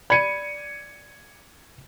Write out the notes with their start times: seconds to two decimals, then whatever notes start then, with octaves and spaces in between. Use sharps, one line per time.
0.10 D5 B5 G#6 C#7 D#7